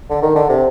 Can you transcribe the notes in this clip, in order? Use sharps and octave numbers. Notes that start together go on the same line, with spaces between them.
D3
D#3
D3
C3